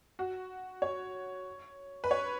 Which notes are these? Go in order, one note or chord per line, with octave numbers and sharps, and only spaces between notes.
F#4
C#5
B4
C#5